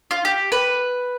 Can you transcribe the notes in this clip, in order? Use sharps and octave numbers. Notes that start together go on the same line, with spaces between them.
F4
G4
B4